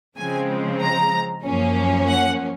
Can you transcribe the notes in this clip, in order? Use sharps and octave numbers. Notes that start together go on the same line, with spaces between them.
C#3 F3 G#3 C4 G#5
A#5
F#2 F3 A#3 C#4
F#5